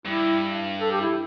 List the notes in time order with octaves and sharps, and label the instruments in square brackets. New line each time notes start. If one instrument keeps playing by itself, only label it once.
[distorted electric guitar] G2 [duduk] E4
[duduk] A4
G4
E4